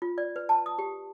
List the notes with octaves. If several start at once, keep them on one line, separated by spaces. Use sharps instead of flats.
F4
D5
B4
A5
D#6
G4